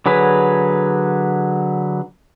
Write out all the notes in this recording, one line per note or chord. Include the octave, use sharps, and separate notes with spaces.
D3 F#3 G#4 B4